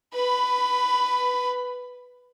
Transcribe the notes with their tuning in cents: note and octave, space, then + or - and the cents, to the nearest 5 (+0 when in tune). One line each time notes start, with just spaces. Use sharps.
B4 +0 B5 +20